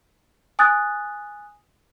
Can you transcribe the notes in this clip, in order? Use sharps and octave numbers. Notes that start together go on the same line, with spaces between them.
G#5 D#6 F#6 A6